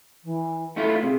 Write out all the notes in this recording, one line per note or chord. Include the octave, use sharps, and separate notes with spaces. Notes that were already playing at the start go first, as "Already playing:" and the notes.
E3
A3 E4 F4 A4
C3 G#4